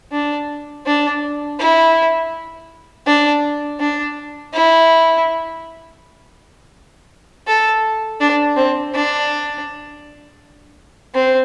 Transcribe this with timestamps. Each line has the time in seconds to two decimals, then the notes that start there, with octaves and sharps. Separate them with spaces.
0.12 D4
0.86 D4
1.59 E4
3.06 D4
3.79 D4
4.53 E4
7.47 A4
8.20 D4
8.56 C4
8.94 D4
11.14 C4